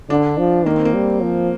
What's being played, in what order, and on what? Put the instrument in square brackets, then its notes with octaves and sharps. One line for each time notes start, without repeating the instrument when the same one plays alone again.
[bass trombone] D3 [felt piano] D4
[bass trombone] F3
[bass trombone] D#3 [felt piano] A#3
[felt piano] C4
A#3
[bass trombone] G3
F3